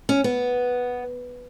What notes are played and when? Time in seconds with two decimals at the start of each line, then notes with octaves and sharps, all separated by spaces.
0.09 C#4
0.24 B3